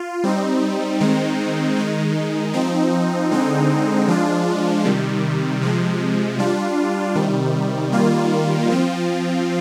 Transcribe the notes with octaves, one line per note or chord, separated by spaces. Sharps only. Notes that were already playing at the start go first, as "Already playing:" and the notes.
Already playing: F4
G3 C4 D#4
D#3 G#3 C4 D#4
D#3 G#3 D#4
F3 C4 D#4
D3 G#3 C4 D#4
F3 G#3 D4 F4
C3 D#3 G3
C3 F3 G#3
G3 D4 F4
C3 D#3 G3
D#3 G3 A#3 F4
F3 C4 F4